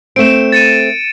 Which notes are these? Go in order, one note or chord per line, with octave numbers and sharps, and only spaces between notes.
A3 C4 D7 E7
A6 C#7 D#7